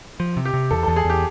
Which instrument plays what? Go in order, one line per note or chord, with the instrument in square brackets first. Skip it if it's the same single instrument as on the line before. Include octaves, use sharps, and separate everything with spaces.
[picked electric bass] F3
C3
[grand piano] G4
[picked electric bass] C3
[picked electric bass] E2 [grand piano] A4
[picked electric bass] E2 [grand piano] A4
[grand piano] G#4
[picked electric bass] E2
[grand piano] G4